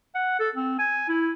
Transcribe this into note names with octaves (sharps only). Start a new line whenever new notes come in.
F#5
A4
C4
G#5
E4